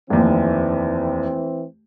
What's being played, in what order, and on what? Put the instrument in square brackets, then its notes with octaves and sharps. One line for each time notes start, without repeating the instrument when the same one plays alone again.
[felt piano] F1 D#2 [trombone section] E3 C4